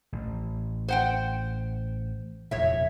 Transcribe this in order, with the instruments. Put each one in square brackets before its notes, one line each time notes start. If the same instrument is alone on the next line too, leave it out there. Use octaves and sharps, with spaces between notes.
[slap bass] A1
[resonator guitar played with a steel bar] C5 F#5 G5
[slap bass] F1 E2 A#2 [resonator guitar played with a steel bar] C#5 E5